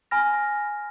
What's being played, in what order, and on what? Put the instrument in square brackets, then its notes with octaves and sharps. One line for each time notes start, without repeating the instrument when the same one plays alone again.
[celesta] G#5 B5 F6 A#6